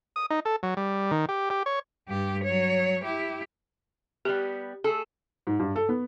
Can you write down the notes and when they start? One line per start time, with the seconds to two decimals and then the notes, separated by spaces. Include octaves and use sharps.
0.16 D#6
0.30 D#4
0.45 A4
0.63 F#3
0.77 G3
1.11 D#3
1.29 G4
1.50 G4
1.66 C#5
2.08 G2 G4
2.44 F#3 C#5
3.04 E4 G4
4.25 G3 B3 G4
4.84 A3 G#4 A4
5.47 G#2
5.59 G2
5.76 A4
5.89 B3